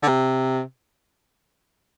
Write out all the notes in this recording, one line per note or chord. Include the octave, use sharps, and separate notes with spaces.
D3
C3